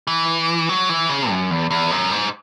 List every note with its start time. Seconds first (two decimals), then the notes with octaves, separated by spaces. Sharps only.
0.07 E3
0.69 F#3
0.89 E3
1.09 C#3
1.30 F#2
1.51 E2
1.71 E2
1.91 F#2
2.12 G#2